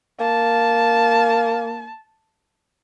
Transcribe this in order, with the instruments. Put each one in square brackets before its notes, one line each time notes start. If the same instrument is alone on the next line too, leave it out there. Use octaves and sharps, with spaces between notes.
[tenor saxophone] A#3 [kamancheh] A5